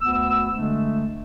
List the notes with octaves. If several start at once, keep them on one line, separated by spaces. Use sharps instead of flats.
D2 B3 E6
D3 G#3 A3 D4